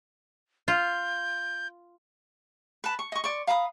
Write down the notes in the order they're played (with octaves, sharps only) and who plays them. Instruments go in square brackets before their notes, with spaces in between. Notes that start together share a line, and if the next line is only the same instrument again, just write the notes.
[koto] F4 [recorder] G6
[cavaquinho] B4 A5
C#6
D#5 C#6
D5 C6 C#6
F5 A#5 B5 D#6